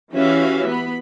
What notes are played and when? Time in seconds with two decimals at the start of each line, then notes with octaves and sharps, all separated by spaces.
0.13 E3 C#4 F#4 G4 E5 F5
0.68 B3 B5